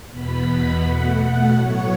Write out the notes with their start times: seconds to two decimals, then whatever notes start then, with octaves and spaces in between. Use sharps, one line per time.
0.10 E2 B2 B3 B5
0.81 B2 A3 F#5
1.52 A2 F#3 B3 C#5